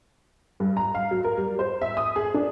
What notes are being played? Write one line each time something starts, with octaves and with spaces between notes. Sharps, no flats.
G2
A#5
F5
F#3
A#4
G3
C5
E5
D#6
G#4
D4